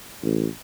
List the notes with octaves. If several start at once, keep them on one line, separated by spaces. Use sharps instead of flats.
A1